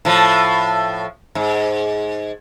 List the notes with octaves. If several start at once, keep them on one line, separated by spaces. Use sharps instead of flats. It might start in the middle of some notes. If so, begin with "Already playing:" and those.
A2 F3
G#2